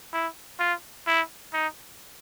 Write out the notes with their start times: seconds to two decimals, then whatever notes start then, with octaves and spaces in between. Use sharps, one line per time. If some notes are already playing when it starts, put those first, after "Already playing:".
0.13 E4
0.60 F4
1.07 E4
1.53 D#4